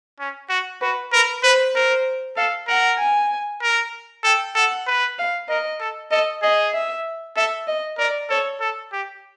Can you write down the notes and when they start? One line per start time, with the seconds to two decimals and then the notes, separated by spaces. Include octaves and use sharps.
0.19 C#4
0.49 F#4
0.81 F#4 B4
1.12 A#4 B4
1.43 B4 C5
1.74 A#4 C5
2.37 A4 F5
2.68 A#4 F#5
2.99 G#5
3.62 A#4
4.24 A4 G5
4.55 A4 F#5
4.87 B4
5.19 F5
5.49 A#4 D#5
5.80 A4
6.11 A4 D#5
6.42 G#4 D#5
6.73 E5
7.36 A4 E5
7.67 D#5
7.98 A#4 D5
8.30 A4 C#5
8.60 A4
8.93 G4